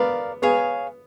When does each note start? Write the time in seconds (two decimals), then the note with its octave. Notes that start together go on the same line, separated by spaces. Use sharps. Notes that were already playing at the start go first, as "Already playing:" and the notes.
Already playing: B3 A#4 D5 F5
0.42 B3 G#4 C#5 F5